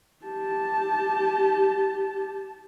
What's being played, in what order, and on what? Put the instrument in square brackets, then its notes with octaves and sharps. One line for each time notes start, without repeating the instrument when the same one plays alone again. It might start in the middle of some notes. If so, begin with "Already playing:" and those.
[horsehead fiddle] G4 A5